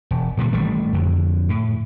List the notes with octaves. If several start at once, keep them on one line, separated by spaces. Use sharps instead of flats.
E1
A#2 D3 E3 G3
A1 D#3 G3 A3
F2 D3
A2